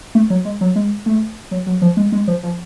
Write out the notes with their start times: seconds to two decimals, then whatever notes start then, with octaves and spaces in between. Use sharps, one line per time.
0.15 A3
0.30 F#3
0.45 G#3
0.61 F#3
0.76 G#3
1.06 A3
1.51 F#3
1.66 F#3
1.82 F3
1.97 G#3
2.12 G#3
2.27 F3
2.43 F3